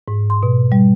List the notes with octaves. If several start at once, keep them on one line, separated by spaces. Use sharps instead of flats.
G#2
C6
B2
G3